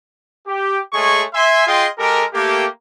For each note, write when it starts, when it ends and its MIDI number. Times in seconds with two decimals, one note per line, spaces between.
0.47 0.79 67
0.93 1.23 56
0.93 1.23 57
0.93 1.23 68
0.93 1.23 73
0.93 1.23 80
0.93 1.23 85
1.34 1.65 76
1.34 1.65 80
1.34 1.65 84
1.66 1.87 65
1.66 1.87 68
1.66 1.87 75
1.66 1.87 79
1.66 1.87 84
1.98 2.24 56
1.98 2.24 67
1.98 2.24 69
1.98 2.24 70
2.34 2.66 57
2.34 2.66 58
2.34 2.66 67